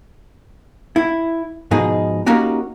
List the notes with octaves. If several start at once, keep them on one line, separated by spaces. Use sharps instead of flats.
E4
G#2 B2 F3 D#4 G#4
A#3 C#4 D#4 F#4 G4